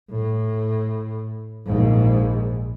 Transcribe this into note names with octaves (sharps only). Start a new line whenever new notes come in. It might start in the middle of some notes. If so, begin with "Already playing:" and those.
A2
A#1 G#2